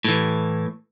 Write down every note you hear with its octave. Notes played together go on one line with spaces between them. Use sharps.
A2 E3